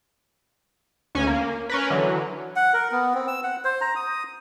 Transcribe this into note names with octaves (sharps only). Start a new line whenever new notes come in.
D2 C#4 G#5
A#3
C#4 A#4 B4
D3 E3 F#3
F#5
A#4
B3
C4
E6
F#5
C5
A#5
D#6